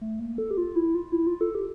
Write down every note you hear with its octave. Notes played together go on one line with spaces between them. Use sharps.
A3
A#3
A4
G4
F4
E4
F4
E4
F4
A4
G4